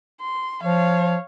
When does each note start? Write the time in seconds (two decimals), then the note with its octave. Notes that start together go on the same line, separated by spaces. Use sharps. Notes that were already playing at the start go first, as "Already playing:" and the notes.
0.22 C6
0.63 F3 C#5 F5